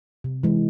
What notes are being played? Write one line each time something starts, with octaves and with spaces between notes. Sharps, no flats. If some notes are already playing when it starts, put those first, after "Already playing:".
C3
E3 G#3